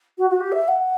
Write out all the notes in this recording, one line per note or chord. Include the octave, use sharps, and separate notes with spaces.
F#4
F#4
G4
E5
F#5